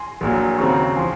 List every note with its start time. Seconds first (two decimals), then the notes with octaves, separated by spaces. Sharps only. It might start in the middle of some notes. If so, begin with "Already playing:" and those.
Already playing: G#5 C6
0.21 A#1 A#2 F#3
0.58 D#2 C#3 F#3 C4 A#5 C#6
0.96 F3 G#5 C6